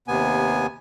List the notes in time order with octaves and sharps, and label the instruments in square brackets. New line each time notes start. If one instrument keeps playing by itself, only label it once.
[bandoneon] D#2 C3 B3 G#5